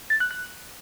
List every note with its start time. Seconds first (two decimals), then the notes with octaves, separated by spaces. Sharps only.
0.10 A6
0.20 F#6
0.31 F#6